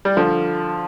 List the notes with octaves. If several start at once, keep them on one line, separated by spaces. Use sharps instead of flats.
G3
D3 F3